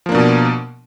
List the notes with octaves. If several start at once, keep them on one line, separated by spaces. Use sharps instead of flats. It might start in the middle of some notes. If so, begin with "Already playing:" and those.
B2 F3 A#3 D4